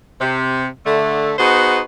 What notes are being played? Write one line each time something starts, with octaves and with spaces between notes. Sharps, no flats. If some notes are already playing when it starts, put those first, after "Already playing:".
C3
D3 A3
B3 D#4 F#4 G#4 B4 C5